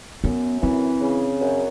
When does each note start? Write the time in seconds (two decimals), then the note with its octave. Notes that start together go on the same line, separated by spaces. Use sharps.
0.24 F#2 B3
0.62 E3 C4
1.01 C#3
1.41 F#2